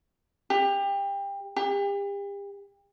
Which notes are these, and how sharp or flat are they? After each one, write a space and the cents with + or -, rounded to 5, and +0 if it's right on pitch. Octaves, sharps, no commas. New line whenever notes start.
G4 +25
G4 +40